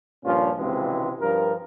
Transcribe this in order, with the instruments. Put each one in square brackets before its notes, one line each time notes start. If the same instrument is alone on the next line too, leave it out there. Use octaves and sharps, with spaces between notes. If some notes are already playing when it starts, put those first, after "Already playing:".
[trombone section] G2 A#2 F3 C#4 F4
G#1 C#2 C3 E3 G#3
G2 F3 A#4